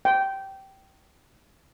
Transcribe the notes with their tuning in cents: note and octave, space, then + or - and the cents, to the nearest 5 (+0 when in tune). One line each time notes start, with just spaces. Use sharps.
G5 -15